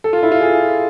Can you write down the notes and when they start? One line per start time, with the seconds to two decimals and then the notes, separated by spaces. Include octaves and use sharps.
0.04 A4
0.13 F4
0.23 E4
0.32 F4
0.41 G#4